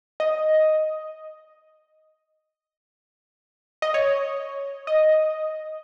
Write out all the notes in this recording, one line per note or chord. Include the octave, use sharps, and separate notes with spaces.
D#5
D#5
C#5
D#5